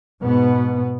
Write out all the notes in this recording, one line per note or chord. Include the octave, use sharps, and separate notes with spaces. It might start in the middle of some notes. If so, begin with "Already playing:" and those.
G#2 B2 B3